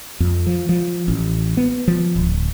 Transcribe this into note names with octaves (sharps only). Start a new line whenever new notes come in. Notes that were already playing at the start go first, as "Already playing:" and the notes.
F2
F3
F3
A1
B3
F3
D1